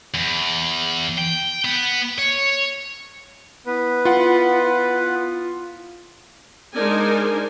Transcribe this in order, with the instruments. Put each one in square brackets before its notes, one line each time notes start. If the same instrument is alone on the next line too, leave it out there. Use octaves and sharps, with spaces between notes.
[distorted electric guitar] E2
G5
B3
C#5
[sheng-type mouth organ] B3 B4 [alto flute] E4
[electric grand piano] F4 F#5
[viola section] G#3 D4 D#4 A#4 C5 G#5